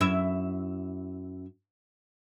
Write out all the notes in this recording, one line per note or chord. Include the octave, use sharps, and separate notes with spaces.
F#2 E4 E5